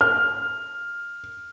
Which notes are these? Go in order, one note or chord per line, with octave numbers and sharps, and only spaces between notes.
F6